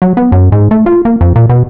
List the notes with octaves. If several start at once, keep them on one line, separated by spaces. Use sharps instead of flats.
F#3
B3
F#2
G#2
A3
F4
A#3
F2
A#2
B2